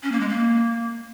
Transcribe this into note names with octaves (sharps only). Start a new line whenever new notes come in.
C#4
A#3
G#3
A#3